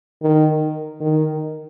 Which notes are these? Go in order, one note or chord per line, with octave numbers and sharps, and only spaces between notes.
D#3
D#3